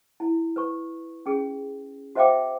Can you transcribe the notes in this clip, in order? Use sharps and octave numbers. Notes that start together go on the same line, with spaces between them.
E4
B4 C#6
C#4 G#4
F#4 C5 E5 F5 G5 D6